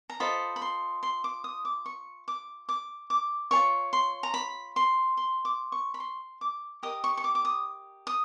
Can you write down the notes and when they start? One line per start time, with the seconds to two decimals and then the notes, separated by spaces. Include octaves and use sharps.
0.10 A#5
0.20 F4 A4 C5 D#5 B5
0.56 B5
0.62 C6
1.03 C6
1.24 D6
1.44 D#6
1.65 D6
1.86 C#6
2.28 D6
2.69 D6
3.10 D6
3.51 F4 G#4 C#5 C#6
3.93 C6
4.23 A#5
4.34 B5
4.76 C6
5.17 C6
5.45 D6
5.72 C#6
5.94 B5
6.00 C6
6.41 D6
6.83 G4 A#4 D#5 D#6
7.04 C#6
7.17 C#6
7.24 D6
7.35 D6
7.45 D#6
8.07 D#6